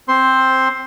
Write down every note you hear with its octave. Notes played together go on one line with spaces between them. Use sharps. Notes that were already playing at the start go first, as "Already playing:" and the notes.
C4 C5 C6